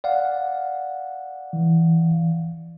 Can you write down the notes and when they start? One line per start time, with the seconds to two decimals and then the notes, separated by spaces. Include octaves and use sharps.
0.04 D5 F5 F#5
1.53 E3